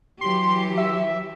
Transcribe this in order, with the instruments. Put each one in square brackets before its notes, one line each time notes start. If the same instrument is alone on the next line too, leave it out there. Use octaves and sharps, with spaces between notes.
[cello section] E3 F#3 G4 [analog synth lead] C6
[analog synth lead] E5